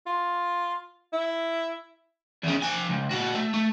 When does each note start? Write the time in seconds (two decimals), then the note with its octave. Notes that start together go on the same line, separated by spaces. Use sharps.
0.06 F4
1.13 E4
2.44 E2 C#3
2.62 F3 G#5
2.90 C#2
3.11 A#2 F#4
3.35 A3
3.54 A3